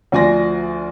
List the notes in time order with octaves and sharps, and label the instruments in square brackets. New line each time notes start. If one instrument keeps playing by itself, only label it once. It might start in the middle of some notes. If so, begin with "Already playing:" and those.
[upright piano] D2 F3 D5 G#5 C6 A#6